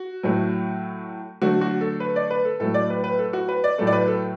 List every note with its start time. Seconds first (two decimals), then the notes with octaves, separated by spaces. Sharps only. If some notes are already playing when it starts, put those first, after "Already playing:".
Already playing: F#4
0.23 A2 F#3 A3
1.42 D3 F#3 A3 F#4
1.61 F#4
1.81 A4
2.00 B4
2.16 D5
2.31 B4
2.45 A4
2.60 A2 F#3 A3 A4
2.74 D5
2.90 B4
3.04 B4
3.19 A4
3.33 F#4
3.49 B4
3.64 D5
3.78 A2 F#3 A3 A4
3.87 D5
3.93 B4
4.08 A4